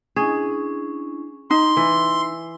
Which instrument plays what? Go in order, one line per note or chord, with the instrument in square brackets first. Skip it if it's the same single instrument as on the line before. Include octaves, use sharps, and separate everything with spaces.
[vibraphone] C#4 D4 E4 [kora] G#4
[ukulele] D#4 [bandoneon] C6
[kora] E3 [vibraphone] E6